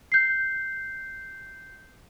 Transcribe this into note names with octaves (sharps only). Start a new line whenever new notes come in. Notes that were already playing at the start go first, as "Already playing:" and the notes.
G6 C7